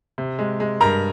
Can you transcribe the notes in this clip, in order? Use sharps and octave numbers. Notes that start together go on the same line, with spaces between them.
C3
G#3
G#3
G2 A#4 A#5